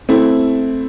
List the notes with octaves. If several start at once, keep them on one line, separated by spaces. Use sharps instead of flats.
A3 C4 E4